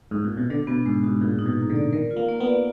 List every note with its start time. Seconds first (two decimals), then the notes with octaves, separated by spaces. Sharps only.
0.11 G#2
0.24 A#2
0.37 B2
0.50 D3 D4
0.67 B2 B3
0.85 G#2 G#3
1.03 G#2 F#4
1.21 A#2 G#4
1.39 D#4
1.46 B2
1.58 A#3
1.70 D3
1.76 D5
1.93 D#3 A#4
2.11 F4
2.16 A#3
2.29 A#3
2.40 B3
2.47 D5